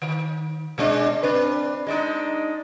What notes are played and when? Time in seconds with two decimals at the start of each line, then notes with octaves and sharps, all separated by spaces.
0.02 D#3
0.78 B2 G#3 D4
1.23 C4 D4 B4
1.87 G#3 D4 D#4